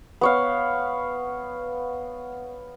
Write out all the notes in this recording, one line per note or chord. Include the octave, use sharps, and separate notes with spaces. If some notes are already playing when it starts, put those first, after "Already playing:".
B3 C#5 F5